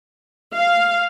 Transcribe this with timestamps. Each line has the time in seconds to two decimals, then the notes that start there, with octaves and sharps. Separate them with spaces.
0.53 F5